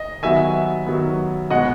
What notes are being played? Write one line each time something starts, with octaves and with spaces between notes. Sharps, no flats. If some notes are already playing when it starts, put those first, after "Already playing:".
Already playing: D#5
D#3 F#3 B3 E5 G#5
D#3 F#3 B3
B2 G#3 B3 D#5 F#5